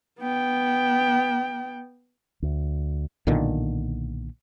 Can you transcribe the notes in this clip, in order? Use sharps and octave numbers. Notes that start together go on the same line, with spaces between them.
B3 G5
D2
B1 A#2 D3 D#3